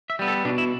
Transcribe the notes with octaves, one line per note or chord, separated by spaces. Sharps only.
E5
G3 B3
A4
B2 D4
E4